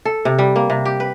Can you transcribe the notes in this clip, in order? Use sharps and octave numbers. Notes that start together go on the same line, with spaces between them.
A4
C3
G3
A#3
C3
G4
B4